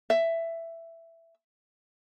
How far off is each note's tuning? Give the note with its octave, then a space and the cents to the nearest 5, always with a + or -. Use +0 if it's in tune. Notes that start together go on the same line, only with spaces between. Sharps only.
E5 +10